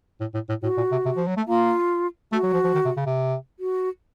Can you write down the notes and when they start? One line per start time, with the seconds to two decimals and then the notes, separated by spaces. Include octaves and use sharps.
0.20 A2
0.34 A2
0.49 A2
0.63 A2 F#4
0.77 A#2
0.92 C3
1.05 C3
1.17 F3
1.27 F#3
1.37 A3
1.48 A#3 F4
2.32 A3 F#4
2.43 F#3
2.54 F3
2.64 F3
2.75 D#3
2.85 C3
2.96 C#3
3.06 C3
3.59 F#4